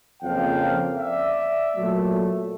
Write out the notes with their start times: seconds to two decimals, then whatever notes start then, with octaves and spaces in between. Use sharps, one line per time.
0.23 F2 C#3 F3 A#3 F5 G5
0.99 D5 E5
1.76 A#2 F#3 A3